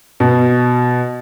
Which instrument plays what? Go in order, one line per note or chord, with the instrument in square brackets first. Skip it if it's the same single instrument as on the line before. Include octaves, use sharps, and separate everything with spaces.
[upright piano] B2